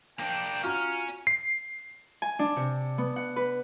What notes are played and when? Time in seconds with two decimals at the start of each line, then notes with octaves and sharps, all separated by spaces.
0.19 A#3 D4 G5
0.64 C#4 F4 F#4 A#5 F6
1.27 C7
2.22 G#5
2.39 D4
2.56 C3
2.98 B3
3.16 F#5
3.36 B4